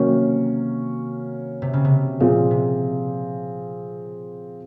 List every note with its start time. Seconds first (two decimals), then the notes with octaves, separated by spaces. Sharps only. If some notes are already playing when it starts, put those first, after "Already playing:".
Already playing: C3 D#3 F#3 A#3 C#4
1.62 C3
1.73 C#3
1.85 C3
2.20 A#2 F3 C4 F4 G#4
2.51 C3